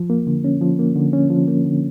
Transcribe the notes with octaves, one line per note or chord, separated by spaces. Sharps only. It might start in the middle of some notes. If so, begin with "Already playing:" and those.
Already playing: F3
A#3
D3
C#4
F3
A#3
D3
C#4
F3
A#3
D3